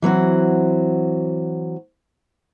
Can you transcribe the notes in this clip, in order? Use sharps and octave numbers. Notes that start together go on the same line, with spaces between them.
E3 F#3 C4 F#4